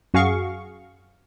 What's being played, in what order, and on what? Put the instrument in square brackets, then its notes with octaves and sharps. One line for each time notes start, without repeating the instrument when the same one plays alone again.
[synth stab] F#2 F#4 G#4 F5 C#6